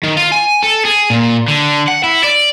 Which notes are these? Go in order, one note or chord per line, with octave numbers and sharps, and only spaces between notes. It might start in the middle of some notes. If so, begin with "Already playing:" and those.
D#3
F4
G#5
A4
G#4
A#2
D3
F#5
E4
D5